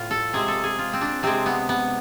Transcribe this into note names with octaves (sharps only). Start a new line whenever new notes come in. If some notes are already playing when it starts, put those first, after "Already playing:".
Already playing: A2 F4
A4
C3 G#3 G#4
A4
G#4
F4
C4
D4
C3 G#3 C4
B3
B3